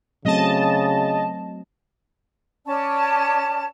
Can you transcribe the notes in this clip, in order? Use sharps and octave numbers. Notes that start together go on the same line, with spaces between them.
C#3 F#3 A3 C4 D#5 A5
C#4 D5 A5